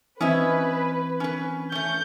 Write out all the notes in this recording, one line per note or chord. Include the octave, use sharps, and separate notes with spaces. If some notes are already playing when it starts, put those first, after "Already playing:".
E3 C4 C#4 B4 D#5 E5 G#6
C#4 B4
A3 C#4 G6